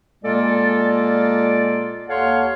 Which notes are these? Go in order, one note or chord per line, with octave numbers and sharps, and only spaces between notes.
A#2 G#3 A#3 F4 A4 D5
D#2 A4 C#5 F5 F#5 C6